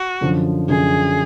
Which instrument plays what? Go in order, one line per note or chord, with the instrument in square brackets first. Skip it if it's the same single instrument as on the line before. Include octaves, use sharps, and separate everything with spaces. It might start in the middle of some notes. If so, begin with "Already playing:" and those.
Already playing: [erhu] F#4
[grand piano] F#2 D3 F3
[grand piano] F#2 D3 F3 [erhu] G#4